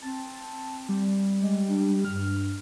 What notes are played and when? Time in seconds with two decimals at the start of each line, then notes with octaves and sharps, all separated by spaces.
0.02 C4 A5
0.89 G3
1.41 G#3
1.68 D4
2.05 G2 F6